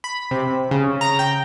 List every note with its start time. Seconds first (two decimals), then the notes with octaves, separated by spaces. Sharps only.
0.04 B5
0.31 C3
0.71 C#3
1.01 A#5
1.19 G5